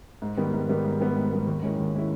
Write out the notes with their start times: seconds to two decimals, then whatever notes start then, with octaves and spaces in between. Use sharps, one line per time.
0.22 G#2
0.37 D#3 G3 B3
0.54 G#2
0.69 D#3 G3 B3
0.85 G#2
1.01 D#3 G3 B3
1.16 G#2
1.32 D#3 G3 B3
1.47 D#2
1.63 D#3 G#3 C#4 E4
1.79 D#2
1.94 D#3 G#3 C#4 E4